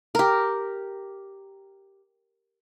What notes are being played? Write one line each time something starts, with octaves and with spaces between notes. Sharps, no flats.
G4 A#4